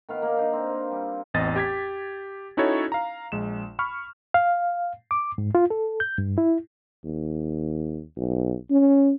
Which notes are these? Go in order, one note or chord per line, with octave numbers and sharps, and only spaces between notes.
D#3 B3 F5
A#3
D4 D#4
C4
A#3
G3
A1 E2 C4 D#5 A6
G4 G#6 B6
C#4 D#4 E4 F#4 A4 C#5
F5 A#5
A#1 G#3 E7
B5 C#6 F6
F5
D6
G#2
F4
A4
G6
G2
E4
D#2
B1
C#4